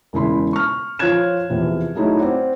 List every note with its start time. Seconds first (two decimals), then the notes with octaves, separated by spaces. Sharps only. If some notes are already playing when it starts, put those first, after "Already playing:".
0.13 E1 C#3 E4 B5 C6
0.53 C#6 F6
0.99 F3 F4 C#5 F#6 G#6 E7
1.50 E2 C3 F3
1.95 F#3 A3 D#4 E4 G#4 C#5
2.19 C4 D5 F#5